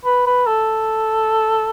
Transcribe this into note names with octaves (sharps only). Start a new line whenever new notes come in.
B4
B4
A4